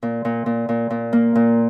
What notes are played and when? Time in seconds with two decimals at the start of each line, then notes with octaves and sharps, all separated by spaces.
0.03 A#2
0.25 A#2
0.46 A#2
0.69 A#2
0.90 A#2
1.13 A#3
1.36 A#2